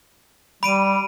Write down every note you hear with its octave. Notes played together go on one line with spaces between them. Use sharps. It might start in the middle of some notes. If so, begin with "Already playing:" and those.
G3 B5 D7 D#7